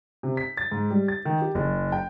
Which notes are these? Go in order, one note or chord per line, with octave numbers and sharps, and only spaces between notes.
C3
B6
A6
G#2
G3
A6
D#3
G4
F#1
G5